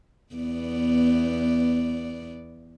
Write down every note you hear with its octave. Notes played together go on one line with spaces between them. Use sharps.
E2 B3 D5